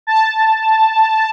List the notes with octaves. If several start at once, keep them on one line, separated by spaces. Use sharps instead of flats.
A5